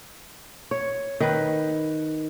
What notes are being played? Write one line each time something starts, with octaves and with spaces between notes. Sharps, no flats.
C#5
D#3 B4